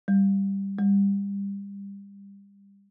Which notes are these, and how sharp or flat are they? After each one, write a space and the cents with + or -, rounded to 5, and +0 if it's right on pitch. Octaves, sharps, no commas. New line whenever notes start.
G3 +5
G3 +25